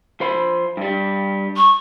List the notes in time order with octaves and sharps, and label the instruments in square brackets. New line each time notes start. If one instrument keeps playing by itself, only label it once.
[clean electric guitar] F3 C5 B5
G2 G3
[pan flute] C#6